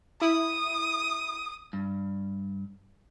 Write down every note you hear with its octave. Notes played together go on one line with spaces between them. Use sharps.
E4 D#6
G2